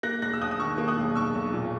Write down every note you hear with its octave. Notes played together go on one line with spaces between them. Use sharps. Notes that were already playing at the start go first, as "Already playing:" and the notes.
A#3 F#6 A#6
E1 F#6 A#6
E6
D#2 D#6 F#6
D#6
D#3 C#6 E6
A#3
D#6 F#6
E1
B1 C#6 E6
B1
A#2